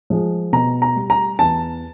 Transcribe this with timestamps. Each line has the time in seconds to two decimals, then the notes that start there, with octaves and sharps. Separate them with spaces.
0.10 F3 G#3
0.53 B2 A#5
0.82 A#5
0.96 G3
1.10 A#5
1.39 E2 A5